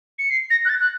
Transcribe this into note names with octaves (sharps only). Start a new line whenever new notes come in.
C#7
C7
A#6
F#6
A6
F#6